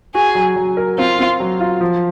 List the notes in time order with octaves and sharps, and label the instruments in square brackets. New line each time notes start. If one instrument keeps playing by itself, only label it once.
[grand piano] F#4 [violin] G#4
[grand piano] F#3
F#3
A#4
[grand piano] C4 [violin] F4
[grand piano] C4
F#3
F4
F3